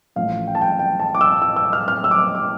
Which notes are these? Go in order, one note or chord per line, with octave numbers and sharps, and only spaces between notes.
A1 A2 F3 F5
G5
A5
G5
G5
A5
D6
E6
E6
E6
F6
F6
E6
D6
E6
D6